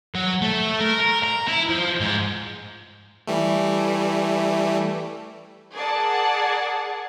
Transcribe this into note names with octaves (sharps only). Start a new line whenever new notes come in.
F#3
A3
A#4
A#4
A#5
E4
F3
G#2
E3 G3 A3
G#4 A#4 D5 F#5 A5